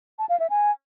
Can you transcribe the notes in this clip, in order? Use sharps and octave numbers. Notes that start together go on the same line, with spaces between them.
A5
F5
E5
G#5